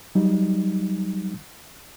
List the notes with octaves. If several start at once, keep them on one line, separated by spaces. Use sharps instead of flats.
F#3 G3 D#4